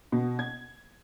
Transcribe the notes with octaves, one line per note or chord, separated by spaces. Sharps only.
B2
G#6